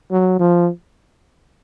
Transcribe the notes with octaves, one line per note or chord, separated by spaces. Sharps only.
F#3
F3